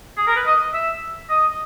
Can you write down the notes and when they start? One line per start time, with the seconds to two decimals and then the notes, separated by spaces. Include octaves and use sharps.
0.17 G#4
0.27 A#4
0.36 B4
0.46 D#5
0.74 E5
1.30 D#5